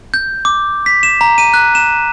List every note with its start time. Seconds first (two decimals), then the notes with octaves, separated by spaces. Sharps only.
0.14 G6
0.45 D6
0.86 B6
1.03 E7
1.21 A#5
1.38 D#7
1.54 F#6
1.75 E7